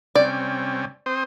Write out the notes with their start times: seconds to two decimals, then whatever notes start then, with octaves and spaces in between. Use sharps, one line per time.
0.15 C3 G3 C#4 D5
1.06 C4 C5 D#6